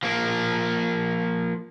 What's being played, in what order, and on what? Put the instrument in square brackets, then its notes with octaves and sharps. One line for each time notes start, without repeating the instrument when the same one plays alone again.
[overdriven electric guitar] F3 A#3